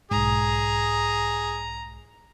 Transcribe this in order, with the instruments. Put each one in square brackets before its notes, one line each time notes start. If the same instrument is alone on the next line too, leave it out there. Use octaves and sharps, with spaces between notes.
[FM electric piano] B1 G#2 [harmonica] G#4 [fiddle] A#5